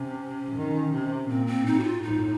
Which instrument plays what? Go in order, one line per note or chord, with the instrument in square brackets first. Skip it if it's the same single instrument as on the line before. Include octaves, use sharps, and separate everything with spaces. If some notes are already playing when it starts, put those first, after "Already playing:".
Already playing: [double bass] C3 [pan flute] C#4
[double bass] D#3
C3
[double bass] A#2 [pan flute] C4
[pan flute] C4
[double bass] A2 [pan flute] D#4
[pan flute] F#4
F4
[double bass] A2 [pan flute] D#4